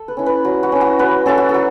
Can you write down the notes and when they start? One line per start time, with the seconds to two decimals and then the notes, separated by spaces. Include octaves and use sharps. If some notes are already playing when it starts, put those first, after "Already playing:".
Already playing: A4
0.08 B4
0.17 C#4 E4
0.26 B4
0.44 F#3 F#4
0.63 F#4
0.72 C#4 E4
0.81 F#4
0.99 F#3 B4
1.26 C#4 E4 A4
1.38 F#4
1.49 A4
1.54 F#3